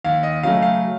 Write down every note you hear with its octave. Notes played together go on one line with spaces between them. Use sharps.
D#2 F5
D#5
C#3 F#3 A3 F5
F5